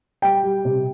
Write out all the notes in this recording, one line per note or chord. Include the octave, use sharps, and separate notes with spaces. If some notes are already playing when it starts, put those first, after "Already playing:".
G3 G5
G3
C3